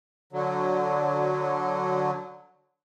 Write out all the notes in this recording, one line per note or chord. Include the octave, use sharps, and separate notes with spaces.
D3 F#3